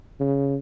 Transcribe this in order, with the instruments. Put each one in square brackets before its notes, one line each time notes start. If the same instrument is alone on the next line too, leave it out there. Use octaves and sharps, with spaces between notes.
[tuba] C#3